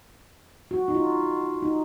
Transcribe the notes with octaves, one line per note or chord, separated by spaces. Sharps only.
F#4
D#4
F4
D#4